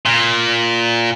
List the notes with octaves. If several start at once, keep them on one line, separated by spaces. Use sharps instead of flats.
A#2